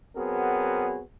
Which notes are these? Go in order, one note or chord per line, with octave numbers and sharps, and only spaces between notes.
F#3 B3 C4 F#4 G#4 A#4